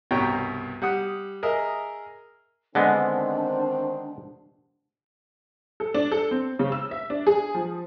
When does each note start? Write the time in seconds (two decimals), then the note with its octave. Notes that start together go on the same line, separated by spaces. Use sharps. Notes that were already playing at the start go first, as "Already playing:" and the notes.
0.11 C2 G2 B2 C#5 G5 A#5
0.82 G3 F#5 D#6
1.43 G#4 A#4 D#5 E5
2.75 D3 D#3 G#3 B3 C4 D4 C5
5.80 A4
5.94 D4
6.11 A4
6.31 C4
6.59 C#3
6.72 E6
6.91 E5
7.10 D4
7.27 G#4
7.55 F3